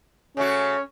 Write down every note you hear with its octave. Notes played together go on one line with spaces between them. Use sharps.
C#3 A3 C#4 F#4